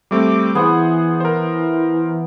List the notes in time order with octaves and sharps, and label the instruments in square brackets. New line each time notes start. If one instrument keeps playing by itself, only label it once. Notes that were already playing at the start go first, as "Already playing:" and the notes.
[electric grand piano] G3 A3 C4 [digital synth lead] D6
[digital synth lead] E3 [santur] B3 [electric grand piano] G#4 C5 F#5
[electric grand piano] A#4 C5